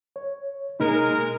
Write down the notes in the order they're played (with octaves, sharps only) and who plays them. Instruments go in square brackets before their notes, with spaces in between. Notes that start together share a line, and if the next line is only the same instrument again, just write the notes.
[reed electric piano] C#5
[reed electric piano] B2 A#3 D#4 [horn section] G#3 A#4